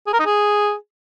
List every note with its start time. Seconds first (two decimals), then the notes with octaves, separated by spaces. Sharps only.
0.07 G#4
0.13 A#4
0.20 D#4
0.26 G#4